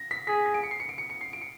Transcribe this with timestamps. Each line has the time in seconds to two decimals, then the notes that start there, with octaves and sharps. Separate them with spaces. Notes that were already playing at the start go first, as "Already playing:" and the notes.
Already playing: A#6
0.11 B6
0.27 G#4 B6
0.46 B6
0.54 D7
0.63 C#7
0.71 C7
0.80 C#7
0.89 D7
0.98 C#7
1.10 C#7
1.21 C7
1.33 D7
1.41 C#7